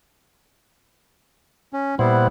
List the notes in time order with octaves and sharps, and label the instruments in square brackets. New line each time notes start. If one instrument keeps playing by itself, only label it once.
[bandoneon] C#4
[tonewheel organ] A#2 C5 F#5 [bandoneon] G3 B3 E4